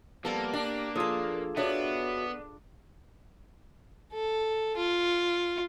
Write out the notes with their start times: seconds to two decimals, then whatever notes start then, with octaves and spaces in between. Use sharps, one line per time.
0.25 F3 G3 A#3 B3 A4
0.53 D4 G4
0.96 F3 F4 G#4 A4 A5
1.57 B3 D4 F#4 C#5 E5
4.12 A4
4.77 F4